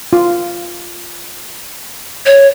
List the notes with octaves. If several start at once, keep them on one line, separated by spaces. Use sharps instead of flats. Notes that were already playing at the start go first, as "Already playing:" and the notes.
F4
C#5